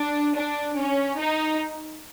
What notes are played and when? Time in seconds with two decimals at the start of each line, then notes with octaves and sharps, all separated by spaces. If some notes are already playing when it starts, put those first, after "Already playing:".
Already playing: D4
0.35 D4
0.76 C#4
1.18 D#4